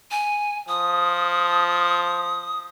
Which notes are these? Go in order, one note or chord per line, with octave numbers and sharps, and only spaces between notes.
G#5
F3 D#6